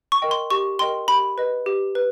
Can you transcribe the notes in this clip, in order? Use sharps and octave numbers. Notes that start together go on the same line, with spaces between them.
C#6
A#4 D#5 G5
C6
G4 C#6
A#4 D#5 G5 C6
G4 B5
B4 D#5
G4
B4